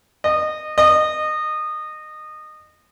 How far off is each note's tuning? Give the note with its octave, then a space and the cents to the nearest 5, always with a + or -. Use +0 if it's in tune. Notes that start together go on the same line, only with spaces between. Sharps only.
D#5 -25
D#5 -25